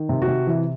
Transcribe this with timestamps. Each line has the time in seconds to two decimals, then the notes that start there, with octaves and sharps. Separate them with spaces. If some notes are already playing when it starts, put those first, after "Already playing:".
Already playing: D#3
0.09 C3
0.22 F#4
0.28 C3
0.47 E3